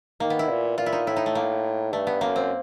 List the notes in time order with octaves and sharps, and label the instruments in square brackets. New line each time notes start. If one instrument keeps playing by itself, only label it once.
[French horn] D#3 [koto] A#3
[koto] B3
E4
[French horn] A#2
[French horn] A#2 [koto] F4
[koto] E4
D#4
[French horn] A2 [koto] E4
[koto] D#4
A3
A#3
[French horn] G2 [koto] A3
[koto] B3
[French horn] F#2 [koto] A#3
[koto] C4